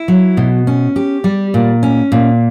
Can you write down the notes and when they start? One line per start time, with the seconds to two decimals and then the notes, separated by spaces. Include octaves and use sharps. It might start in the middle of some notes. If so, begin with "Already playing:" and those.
Already playing: E4
0.08 F#3
0.37 B2
0.67 C#4
0.96 G4
1.24 G3
1.54 A#2
1.83 C#4
2.12 A#2